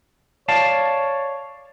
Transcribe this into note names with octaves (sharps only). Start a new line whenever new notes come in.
C#5 D5 F5 A5